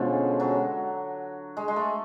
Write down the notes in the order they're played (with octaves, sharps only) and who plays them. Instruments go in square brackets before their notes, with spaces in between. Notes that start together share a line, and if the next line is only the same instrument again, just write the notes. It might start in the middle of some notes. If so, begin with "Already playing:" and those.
Already playing: [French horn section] B2 G#3 C#4 [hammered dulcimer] D3 F3
[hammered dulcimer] F#3
G#3
G#3
A3